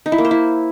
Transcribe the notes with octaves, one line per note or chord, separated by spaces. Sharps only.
D#4
E4
A#3
C5
E4